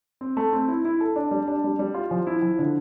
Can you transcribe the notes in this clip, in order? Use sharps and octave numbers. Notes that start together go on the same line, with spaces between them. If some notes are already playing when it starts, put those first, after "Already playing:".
C4
A3
C4
E4
E4
A4
D4
G3
D4
G3
G3
F4
F3
E4
F3
D3